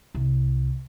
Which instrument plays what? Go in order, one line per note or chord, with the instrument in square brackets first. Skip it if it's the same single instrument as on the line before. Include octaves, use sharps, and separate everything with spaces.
[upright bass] C2